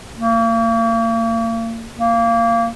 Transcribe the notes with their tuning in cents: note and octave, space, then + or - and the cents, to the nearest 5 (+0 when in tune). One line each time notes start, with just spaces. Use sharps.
A#3 -40
A#3 -20